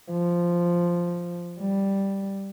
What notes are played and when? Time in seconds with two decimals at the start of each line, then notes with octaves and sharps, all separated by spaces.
0.10 F3
1.60 G3